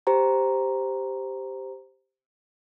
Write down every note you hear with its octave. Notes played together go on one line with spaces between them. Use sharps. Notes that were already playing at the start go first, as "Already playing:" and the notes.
G4 C5 A#5